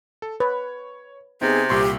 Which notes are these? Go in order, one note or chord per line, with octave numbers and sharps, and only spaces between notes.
A4
B4 C#5
C3 B3 C4 D#4 G#4
C2 A#2 G4 C6 C#6